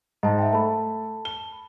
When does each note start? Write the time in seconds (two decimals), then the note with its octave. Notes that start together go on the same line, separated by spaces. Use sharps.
0.23 G#2 D#5 A5
0.39 E5 G5
0.53 A3 A5 B5
1.25 G7